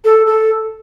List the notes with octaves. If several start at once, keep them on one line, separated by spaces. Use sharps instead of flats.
A4
A4